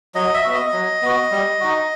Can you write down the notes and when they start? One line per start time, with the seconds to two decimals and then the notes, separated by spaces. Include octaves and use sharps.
0.15 F#3 D#5
0.34 E5
0.44 B3 F#4
0.54 D#5
0.73 F#3
1.02 B3 F#4
1.32 G3
1.60 D#4 F#4